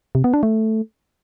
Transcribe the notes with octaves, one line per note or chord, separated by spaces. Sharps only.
C3
B3
D4
A3